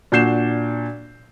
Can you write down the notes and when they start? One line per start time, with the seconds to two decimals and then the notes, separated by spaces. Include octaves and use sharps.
0.12 A#2 D4 F#4 G6 C7 E7